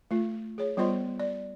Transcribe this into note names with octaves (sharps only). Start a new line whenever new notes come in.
A3 F4
G#4 C#5
G3 B3 F4 C5 D#5 C6
D5